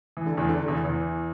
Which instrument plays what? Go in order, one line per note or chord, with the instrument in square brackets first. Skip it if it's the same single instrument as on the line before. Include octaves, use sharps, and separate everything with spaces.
[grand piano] E3
D3
E2 E3
D3
D3
E2 E3
E2 E3